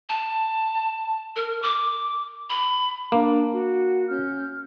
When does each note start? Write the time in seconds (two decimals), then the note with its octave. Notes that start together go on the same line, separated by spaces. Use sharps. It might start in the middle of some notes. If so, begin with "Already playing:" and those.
0.09 A5
1.36 A#4
1.62 D6
2.50 B5
3.12 A#3 D4 D6
3.52 F#4
4.09 C#4 F6 G6